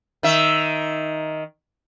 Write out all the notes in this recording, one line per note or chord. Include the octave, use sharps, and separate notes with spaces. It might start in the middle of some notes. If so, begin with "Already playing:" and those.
D#3 E5